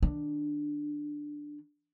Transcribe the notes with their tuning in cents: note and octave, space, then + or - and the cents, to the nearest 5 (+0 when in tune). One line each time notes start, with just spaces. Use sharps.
D#3 +10 D4 +5